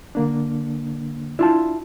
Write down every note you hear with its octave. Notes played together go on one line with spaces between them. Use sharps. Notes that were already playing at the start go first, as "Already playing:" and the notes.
D3 A#3 D4
D4 E4 F4 A5